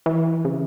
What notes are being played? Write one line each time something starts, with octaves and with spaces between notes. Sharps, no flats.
E3
C#3